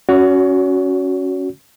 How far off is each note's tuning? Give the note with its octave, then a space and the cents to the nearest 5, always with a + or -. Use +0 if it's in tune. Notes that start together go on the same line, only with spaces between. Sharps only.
C#4 +0 F#4 +0 C#5 +35